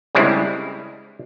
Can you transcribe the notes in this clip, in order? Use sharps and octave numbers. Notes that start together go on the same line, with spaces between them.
C#3 G3 G#3 C4 D4 E4